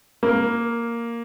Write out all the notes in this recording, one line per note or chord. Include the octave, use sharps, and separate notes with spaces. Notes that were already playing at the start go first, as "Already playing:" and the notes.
A#3